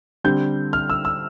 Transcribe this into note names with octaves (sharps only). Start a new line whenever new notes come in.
D3 G3 C4 G6
F6
E6
E6